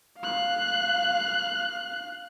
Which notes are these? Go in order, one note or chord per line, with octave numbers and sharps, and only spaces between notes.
F5 F#6